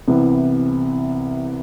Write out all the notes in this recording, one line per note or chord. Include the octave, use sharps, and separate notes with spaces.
C2 C3 E3 B3 E4